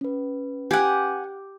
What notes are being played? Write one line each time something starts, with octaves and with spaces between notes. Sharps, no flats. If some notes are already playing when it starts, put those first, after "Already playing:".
C#4 B4
G4 F#5 G#5